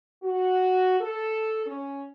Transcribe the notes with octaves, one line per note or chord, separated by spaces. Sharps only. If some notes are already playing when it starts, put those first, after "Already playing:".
F#4
A4
C#4